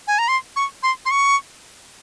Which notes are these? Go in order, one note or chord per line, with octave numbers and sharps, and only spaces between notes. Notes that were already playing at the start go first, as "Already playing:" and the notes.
G#5
A#5
C6
C#6
C6
C6
C#6